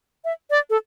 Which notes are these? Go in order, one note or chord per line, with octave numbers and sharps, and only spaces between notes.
E5
D5
A4